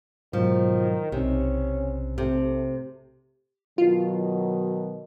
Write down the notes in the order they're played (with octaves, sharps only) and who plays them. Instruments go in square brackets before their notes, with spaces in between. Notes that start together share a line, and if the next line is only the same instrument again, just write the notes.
[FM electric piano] G#2 B2 F#3 [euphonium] D#3 [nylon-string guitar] F3
[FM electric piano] B1 D#4 [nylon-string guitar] C3 [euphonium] C#4
[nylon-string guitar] C3 [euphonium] A3
[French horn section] B2 D#3 F#3 [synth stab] F4